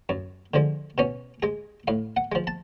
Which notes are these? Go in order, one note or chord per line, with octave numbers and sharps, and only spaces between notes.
F#2
D3 F3 G#3
B2 C#4
G#3 G#4
A2 F5
F#5
F3 G#3
A5